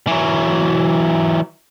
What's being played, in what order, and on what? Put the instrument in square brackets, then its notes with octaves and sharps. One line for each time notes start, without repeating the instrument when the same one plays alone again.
[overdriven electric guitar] E3 F#3